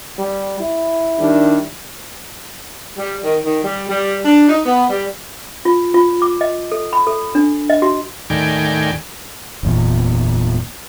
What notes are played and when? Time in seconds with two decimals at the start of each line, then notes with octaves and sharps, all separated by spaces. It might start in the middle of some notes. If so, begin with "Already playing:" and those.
0.18 G3
0.60 E4
1.19 D#3 G3 D4
2.98 G3
3.24 D#3
3.44 D#3
3.64 G3
3.89 G3
4.25 D4
4.49 D#4
4.65 B3
4.89 G3
5.65 F4
5.94 F4
6.22 D6
6.41 D#5
6.72 A4
6.93 B5
7.07 A4
7.35 D4
7.70 D#5
7.82 F#4
8.30 D#2 A2 D#3 D5 G5 G#5
9.63 F#1 E2 A#2